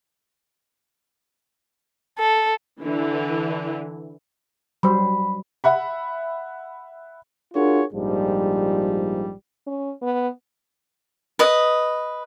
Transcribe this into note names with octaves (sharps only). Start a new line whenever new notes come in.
A4
D3 E3
F#3 G3 C5 B5
E5 F#5 B5
D4 F4 F#4 G#4 A#4 C#5
A#1 G#2 F3 G3
C#4
B3
B4 D#5